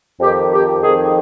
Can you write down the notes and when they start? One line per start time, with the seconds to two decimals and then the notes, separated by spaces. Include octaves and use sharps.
0.21 F2 D#3 G4
0.52 G4
0.82 F2 D#3 G#4